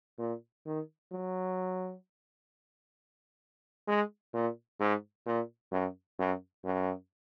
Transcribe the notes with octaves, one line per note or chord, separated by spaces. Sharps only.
A#2
D#3
F#3
G#3
A#2
G#2
A#2
F#2
F#2
F#2